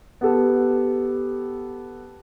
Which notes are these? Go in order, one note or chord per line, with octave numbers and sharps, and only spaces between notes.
B3 G4 A4